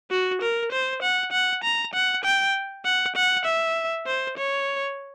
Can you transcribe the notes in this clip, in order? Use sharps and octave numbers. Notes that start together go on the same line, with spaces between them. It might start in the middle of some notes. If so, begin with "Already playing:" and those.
F#4
A#4
C5
F#5
F#5
A#5
F#5
G5
F#5
F#5
E5
C5
C#5